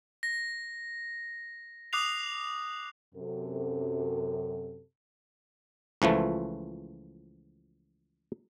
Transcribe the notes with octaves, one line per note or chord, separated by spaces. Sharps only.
A#6
D6 D#6 F#6 C7 F7
F#2 C3 A4
C#2 E3 F3 A3